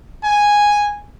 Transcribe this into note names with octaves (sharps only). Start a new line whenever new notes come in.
G#5